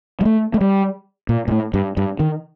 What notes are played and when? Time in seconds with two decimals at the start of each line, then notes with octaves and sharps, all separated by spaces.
0.21 G3
0.25 A3
0.54 A3
0.61 G3
1.29 A#2
1.48 A#2
1.51 A2
1.74 G2
1.97 G2
2.20 D#3